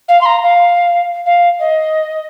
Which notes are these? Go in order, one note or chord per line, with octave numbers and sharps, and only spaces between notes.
F5
C6
A#5
F5
F5
D#5